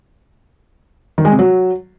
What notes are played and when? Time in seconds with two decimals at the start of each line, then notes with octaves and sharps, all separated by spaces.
1.18 D#3
1.25 G#3
1.32 C3
1.39 F#3